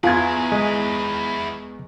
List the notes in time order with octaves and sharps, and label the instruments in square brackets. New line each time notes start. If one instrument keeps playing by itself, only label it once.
[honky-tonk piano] E2 G#6 [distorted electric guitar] E4 G#4 [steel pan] F4
[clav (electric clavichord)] G#3